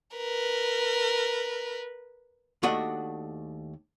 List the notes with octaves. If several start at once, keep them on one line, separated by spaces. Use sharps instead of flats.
A#4 B4
D#2 A3 D4 F#4 D#5 F#5